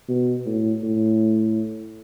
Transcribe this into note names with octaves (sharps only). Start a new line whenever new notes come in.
B2
A2
A2